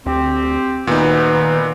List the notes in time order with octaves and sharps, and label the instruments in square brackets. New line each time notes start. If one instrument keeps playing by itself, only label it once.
[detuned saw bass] D2 [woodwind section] C4 G4
[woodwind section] D2 B3 [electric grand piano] A#2 D#4 [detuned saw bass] D#3 [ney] B4